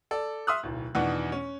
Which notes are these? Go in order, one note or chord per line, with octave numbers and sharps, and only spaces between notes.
A4 D5
E5 C6 D#6 F6 F#6
D1 B1
E2 B2 D#3 B3 D4
C#4